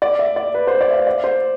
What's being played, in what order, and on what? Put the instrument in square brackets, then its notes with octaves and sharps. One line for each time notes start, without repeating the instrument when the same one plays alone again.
[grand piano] D5
E5
D5
B4
C5
D5
E5
F5
D5
C5